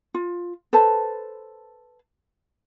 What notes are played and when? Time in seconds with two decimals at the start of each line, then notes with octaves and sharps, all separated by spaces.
0.14 F4
0.73 A4 B4 C5 A5